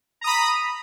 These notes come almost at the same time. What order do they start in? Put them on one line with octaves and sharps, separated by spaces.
A#5 D#6 B5